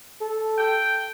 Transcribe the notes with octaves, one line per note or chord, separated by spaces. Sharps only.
A4
G5